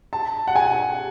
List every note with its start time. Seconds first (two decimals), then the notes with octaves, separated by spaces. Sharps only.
0.13 A5
0.47 F#5
0.55 G#5